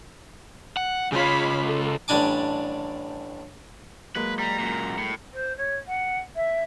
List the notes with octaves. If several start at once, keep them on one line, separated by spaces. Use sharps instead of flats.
F#5
C#3 F4 C#5 F5 B5
A4
A1 G3 D4 G#5 D6
F#3 G#3 A#3 B4
G3 A#5
F#2 A#2
A2
C5
C#5
F#5
E5